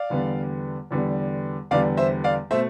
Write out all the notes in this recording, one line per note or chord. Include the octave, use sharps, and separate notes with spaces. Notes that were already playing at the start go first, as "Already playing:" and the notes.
Already playing: D5 F5
E2 D3 G3 B3
E2 D3 G3 B3
E2 D3 G3 B3 D5 F5
C5 E5
D5 F5
B2 A3 C5 E5